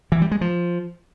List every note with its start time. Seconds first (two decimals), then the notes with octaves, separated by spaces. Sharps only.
0.12 E3
0.22 G3
0.31 G#3
0.41 F3